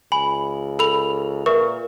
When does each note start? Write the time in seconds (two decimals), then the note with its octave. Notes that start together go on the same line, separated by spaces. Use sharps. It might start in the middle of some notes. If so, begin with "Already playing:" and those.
0.12 C#2 G#5 B5
0.79 A4 B5 F7
1.46 A#2 A#4 B4 E5 C#6